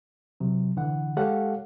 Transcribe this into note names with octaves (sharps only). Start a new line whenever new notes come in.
C3 F#3
C2 D3 E3 F#5
G#3 G4 A4 C#5 F5 F#5